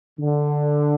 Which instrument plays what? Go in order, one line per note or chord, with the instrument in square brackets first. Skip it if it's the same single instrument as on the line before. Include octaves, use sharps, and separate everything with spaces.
[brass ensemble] D3